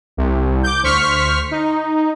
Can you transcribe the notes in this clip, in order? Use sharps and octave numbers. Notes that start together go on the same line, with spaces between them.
C2
D6 G6
D2 C5 C#6 F6 B6
D#4